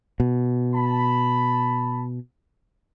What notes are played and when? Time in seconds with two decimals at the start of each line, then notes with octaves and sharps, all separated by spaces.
0.20 B2
0.75 A5 B5